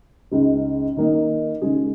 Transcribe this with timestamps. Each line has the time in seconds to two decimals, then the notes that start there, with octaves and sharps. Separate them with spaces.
0.31 C#2 C#3 G#3 D#4
0.97 D#3 A#3 D#4
1.62 C#3 G#3 D#4 G#4